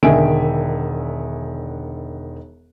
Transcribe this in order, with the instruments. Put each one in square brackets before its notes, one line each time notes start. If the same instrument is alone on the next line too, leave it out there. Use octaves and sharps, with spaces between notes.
[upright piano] E1 D3 D#3 E5 G#5 D7